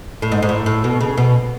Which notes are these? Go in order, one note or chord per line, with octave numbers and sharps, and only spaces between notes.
A2
G#2
G#2
A2
A2
B2
C#3
B2